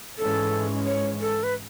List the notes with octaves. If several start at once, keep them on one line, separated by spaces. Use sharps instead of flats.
G#2 E3 G#3 C#4 A4
C#5
A4
B4